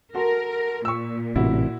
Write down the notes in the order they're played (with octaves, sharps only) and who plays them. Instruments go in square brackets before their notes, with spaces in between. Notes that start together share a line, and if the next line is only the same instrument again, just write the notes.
[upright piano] F#4 A4 C6 [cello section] A#4
[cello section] A#2 [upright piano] C#6 E6
[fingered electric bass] A1 A2 C3 [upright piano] E4 F#4